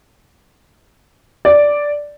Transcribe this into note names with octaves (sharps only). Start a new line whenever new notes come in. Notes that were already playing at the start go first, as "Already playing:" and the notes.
D5